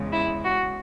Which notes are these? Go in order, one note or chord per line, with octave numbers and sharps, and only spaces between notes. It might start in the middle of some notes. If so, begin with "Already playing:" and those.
Already playing: E2 C#3 G#3
E4
F#4